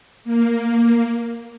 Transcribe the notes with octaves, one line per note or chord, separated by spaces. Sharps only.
A#3